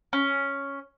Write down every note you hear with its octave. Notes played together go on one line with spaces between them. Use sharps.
C#4